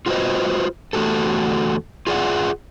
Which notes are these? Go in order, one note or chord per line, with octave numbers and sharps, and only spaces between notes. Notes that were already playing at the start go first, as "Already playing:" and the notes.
F4 F#4 B4 C5 D#5
E2 A3 F#4 G4 A4
F4 G#4 D5 E5 F#5